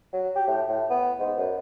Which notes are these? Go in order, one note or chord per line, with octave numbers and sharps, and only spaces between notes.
F#3
G4
A2
A2
B3
G#2
F#2